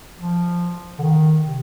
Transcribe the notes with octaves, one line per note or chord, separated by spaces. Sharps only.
F3
D3
D#3
C3